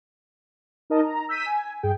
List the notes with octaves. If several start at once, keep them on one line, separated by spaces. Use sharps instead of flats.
D#4 A#4 D#5 A5
A#5
E6 G6 B6 D#7
G#5
G2 G#4 G5